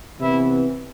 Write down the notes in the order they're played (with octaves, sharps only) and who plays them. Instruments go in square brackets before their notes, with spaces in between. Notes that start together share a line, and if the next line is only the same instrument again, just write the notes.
[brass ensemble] C3 E3 B3 E4